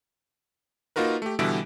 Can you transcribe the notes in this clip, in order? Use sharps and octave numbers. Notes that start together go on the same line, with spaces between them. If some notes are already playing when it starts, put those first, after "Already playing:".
A#3 D#4 F4 F#4 A#4 B4
A3 G4
B2 D3 E3 G3 E5 D7